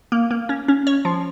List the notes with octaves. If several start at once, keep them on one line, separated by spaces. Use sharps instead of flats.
A#3
A#3
C#4
C#4
C#5
F3